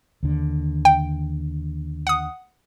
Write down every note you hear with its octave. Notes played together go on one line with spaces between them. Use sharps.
D#2 D3
G5
F#5 D#6